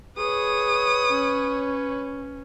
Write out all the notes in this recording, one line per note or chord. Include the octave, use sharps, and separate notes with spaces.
G#4 B4 C#5 D#6
C#4